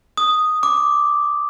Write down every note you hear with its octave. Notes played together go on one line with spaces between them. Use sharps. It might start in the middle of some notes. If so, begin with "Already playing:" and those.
D#6
D6